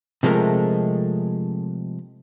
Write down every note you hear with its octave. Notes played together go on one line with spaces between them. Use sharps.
C3 F3 G#3 A3 A#4